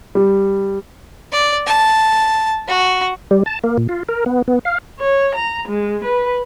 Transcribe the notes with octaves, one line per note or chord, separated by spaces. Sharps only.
G3
D5
A5
F#4
G3
A5
A#3
A#2
F4
A#4
B3
B3
F5
C#5
A#5
G#3
B4